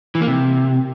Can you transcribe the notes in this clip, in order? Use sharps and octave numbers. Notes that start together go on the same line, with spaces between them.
E3
A#3
C3